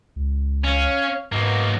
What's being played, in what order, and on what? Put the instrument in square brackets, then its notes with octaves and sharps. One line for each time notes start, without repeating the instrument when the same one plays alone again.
[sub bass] C#2
[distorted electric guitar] C#4 [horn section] C#5 F5
[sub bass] G#2 [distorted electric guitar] F#3 A#3 [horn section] B3 D#5